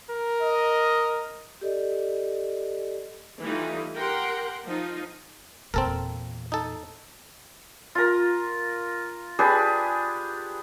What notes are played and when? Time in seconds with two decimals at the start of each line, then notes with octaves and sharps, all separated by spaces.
0.10 A#4
0.42 D#5
1.61 G4 A4 D5 D#5
3.41 E3 G3 A3 D#4 F4
3.96 G4 A#4 F#5 G5 C6
4.66 F3 D#4 F4
5.74 E2 A#2 C4 A4 A#4
6.52 D#4 A4
7.95 F4 A#4
9.39 D4 G4 G#4 B4